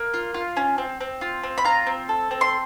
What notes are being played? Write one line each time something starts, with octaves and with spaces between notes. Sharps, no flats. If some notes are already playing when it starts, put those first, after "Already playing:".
Already playing: A#3
F4
F4
C#4
C4
C4
F4
C4
B5
F4 A#5
C4
A4
C4
C6